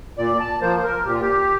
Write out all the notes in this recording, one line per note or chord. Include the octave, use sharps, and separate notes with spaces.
A#2 D5
A5
F3 A#3 C5
C5
A#4
A#2 G4
F4
G4